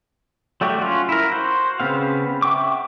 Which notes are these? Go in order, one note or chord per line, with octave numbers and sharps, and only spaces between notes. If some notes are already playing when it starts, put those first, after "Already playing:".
F#3 G3 A3 F#4 G4
C#4 F4 F#4
E4 A#4
F#4 C5
C#3 B3 C4 F5
E5 F#5 G5 C#6 D6